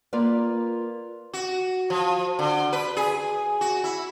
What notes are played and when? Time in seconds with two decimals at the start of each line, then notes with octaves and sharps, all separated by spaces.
0.13 A#3 F4 A#4 B4 D5
1.34 F#4
1.90 F3
2.39 D3
2.73 B4
2.97 G#4
3.61 F#4
3.84 E4